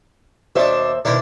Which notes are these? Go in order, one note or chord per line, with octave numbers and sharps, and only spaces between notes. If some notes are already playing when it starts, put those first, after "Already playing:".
D#2 B2 D4 C5 E5
B2 D#3 D4 E4 C5